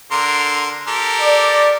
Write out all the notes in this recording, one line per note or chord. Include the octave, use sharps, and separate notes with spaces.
D3 A#4 C6
G4 A4 A#4
D5